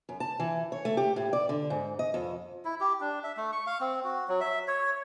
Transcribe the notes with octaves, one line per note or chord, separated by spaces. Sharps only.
F#2
A5
E3
C#5
A3
G4
A2
D5
D3
G#2
D#5
F2
E4
G4
D4
E5
A3
C#6
F5
C4
F#4
F#3
E5
C#5